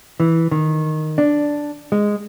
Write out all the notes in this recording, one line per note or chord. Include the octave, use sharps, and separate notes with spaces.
E3
D#3
D4
G#3